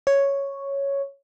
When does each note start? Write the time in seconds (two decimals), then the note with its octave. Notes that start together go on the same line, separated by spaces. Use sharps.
0.07 C#5